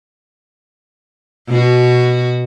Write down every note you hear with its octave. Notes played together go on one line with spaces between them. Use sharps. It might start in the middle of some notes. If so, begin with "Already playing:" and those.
B2 F#4